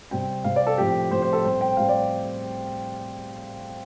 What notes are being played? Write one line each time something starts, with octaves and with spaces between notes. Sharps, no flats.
C3 G3 C4 G5
C3 G3 C4 F5
D5
A4
A2 F3 C4 G4
A2 F3 C4 C5
C5
A4
A2 G3 C4 C5
G5
A2 G3 C4 F5
D5